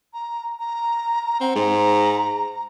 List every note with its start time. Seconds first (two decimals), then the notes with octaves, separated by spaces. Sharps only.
0.13 A#5
0.59 A#5
1.41 C4 F#5
1.56 G#2 A#5